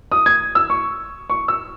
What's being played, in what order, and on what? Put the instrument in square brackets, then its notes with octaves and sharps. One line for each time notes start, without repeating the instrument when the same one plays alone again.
[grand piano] D#6
G#6
E6
C#6
C#6
E6